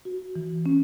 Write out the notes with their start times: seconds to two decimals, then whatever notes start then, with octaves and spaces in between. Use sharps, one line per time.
0.05 F#4
0.36 E3
0.66 C#4